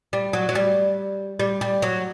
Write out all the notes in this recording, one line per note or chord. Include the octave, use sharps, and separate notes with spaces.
G3
F#3
F#3
G3
G3
G3
F#3